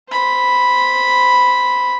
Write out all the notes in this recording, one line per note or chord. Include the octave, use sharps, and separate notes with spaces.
C5 B5